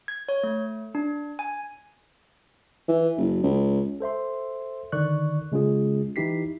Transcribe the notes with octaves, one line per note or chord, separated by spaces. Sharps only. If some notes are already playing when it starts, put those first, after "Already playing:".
G#6
C#5
A3
D4
G#5
E3
F#1
C#2
A4 C5 E5 C6
D3 D#3 D5 C#6 F#6
C#3 G#3 C#4 F4 G#4
E3 D#4 E4 G4 B6 C7